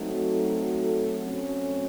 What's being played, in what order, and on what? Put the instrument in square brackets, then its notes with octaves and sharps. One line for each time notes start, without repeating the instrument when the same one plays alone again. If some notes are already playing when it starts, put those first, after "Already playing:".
Already playing: [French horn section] F#3 A3 C4 F#4 A4 [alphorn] D#4
[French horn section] F#3 A3 C4 [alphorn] C#4